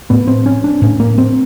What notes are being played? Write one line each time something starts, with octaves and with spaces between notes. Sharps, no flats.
A2 B3
C4
C#4
D4
A2 C#4
A#3
C4